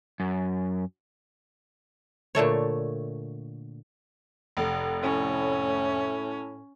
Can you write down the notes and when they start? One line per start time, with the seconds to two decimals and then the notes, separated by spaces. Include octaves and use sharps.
0.20 F#2
2.35 A#2 D3 A3 C#5
4.57 F1
5.02 A2 C#4